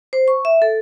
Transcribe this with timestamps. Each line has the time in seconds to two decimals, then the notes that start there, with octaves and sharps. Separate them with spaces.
0.13 C5
0.28 C#6
0.45 E5
0.62 A4